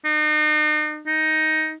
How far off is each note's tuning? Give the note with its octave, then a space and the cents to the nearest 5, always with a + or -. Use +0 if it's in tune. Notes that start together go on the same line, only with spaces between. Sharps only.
D#4 -40
D#4 +10